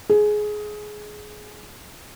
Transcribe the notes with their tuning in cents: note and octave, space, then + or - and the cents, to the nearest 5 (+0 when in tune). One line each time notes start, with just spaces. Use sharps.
G#4 +15